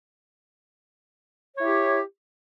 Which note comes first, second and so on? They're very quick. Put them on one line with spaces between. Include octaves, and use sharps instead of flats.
C#5 E4 G4